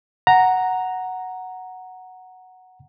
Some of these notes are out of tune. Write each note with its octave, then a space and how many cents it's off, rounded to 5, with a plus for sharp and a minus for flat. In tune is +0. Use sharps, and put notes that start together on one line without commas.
F#5 +0 A#5 +0